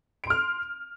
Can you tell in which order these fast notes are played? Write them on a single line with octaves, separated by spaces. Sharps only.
D7 C6 F6